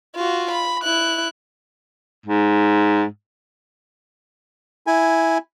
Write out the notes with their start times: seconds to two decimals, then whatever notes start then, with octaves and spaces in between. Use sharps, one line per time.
0.16 F4 F#4
0.51 B5
0.84 E4 F#6
2.26 G#2
4.87 E4 G#5